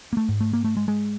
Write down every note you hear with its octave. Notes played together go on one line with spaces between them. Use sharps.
A#3
A3
G#2
A3
A#3
A3
G#3
G#3